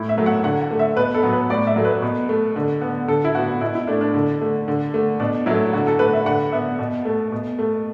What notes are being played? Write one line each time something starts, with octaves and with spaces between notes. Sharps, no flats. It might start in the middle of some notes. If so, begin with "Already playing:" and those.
Already playing: A2 E4
E5
F#3 A3
F#5
D3 F#5
F#5
A3
E5
B2 B4
A4
F#3 B3
B4
A2 D5
E5
F#3 A3
B4
B2
A3
D3
B3
D3 A4
E4
B3 F#4
B2 E4
E4
A3 D4
D4
D3
A3
D3
A3
B2 D4
F#3 A3 E4
D3 F#4
A4
A3 B4
E5
D3 F#5
B3 E5
B2
A3
B2
A3